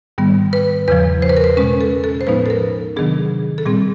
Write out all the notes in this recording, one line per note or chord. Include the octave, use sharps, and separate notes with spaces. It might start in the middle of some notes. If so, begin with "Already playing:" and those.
G#2 D#3 G3 B3
B4
E2 C#3 F3 B4
C5
B4
A#4
B4
B2 G#3 C#4 B4
A4
A4
C5
A2 F3 G#3 B3 D#4 B4
A4
A#4
C3 D#3 F#3 B3 D4 G#4
A4
A#2 G3 C4 G#4